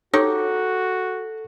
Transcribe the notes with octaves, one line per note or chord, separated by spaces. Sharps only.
D#4 F#4 G4 A4 C#5